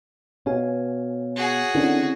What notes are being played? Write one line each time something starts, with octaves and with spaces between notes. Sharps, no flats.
B2 C#5 F5 G#5
F#4 G#4
D3 C4 C#4 E4